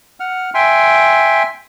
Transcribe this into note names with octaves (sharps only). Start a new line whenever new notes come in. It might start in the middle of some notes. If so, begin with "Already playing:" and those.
F#5 F6
E5 G5 G#5 C6